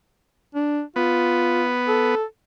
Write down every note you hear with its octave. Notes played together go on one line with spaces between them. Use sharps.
D4
B3 F4
A4